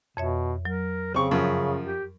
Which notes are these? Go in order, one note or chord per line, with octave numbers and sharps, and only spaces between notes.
F2 B2 C#5 E5
F#3 A#4
C#3 C4 C#6
F#2 F3
G4